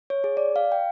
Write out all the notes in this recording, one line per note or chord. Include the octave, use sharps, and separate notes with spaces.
C#5
G#4
D5
F5
G5